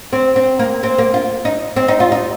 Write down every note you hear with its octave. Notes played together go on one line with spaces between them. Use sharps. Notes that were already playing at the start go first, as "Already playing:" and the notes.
C4
C4
A#3
C4
A#3
F4
D#4
C4
D#4
F4
D#4